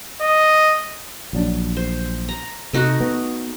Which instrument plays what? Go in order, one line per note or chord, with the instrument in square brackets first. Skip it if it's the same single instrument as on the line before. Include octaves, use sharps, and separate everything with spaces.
[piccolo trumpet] D#5
[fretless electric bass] A#1 F#3 D4
[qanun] C5
A#5
[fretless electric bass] C3 [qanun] A3 D#4 F#4
[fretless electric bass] B3